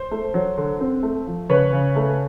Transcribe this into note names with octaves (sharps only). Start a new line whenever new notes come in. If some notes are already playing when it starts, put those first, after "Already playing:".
Already playing: C5
A3
F#3
D3
C4
A3
F3
C#3 B4 C#5
C#3
A3